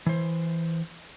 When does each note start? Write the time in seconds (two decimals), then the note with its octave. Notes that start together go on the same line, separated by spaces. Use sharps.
0.06 E3 C5